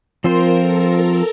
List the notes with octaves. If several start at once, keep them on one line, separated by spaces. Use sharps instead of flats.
F3 C4 F4 A#4 C5
A4
A#4